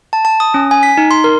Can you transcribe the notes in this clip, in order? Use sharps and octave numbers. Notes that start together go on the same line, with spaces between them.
A5
A5
D#6
C#4
G#5
B6
D#4
C6
A#4